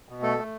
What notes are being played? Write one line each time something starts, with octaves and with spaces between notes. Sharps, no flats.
B2
A3 A4
A3